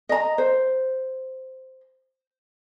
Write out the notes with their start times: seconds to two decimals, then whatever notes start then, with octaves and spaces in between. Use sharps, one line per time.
0.09 D#5 A#5
0.38 C5